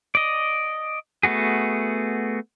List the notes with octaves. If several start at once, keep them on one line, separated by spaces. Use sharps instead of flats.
D5 D#5
A3 B3 F#4 G#4